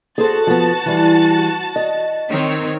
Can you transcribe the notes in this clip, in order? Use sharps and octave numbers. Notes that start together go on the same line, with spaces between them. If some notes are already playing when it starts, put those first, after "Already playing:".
F#4 G#4 A4 C5 A5 A6
F3 B3
E3 G3
D#5
D#3 C4 C#5